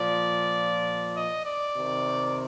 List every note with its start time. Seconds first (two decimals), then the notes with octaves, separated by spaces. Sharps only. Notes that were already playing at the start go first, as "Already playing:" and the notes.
Already playing: A#2 F3 D5
1.16 D#5
1.46 D5
1.75 C3 D#3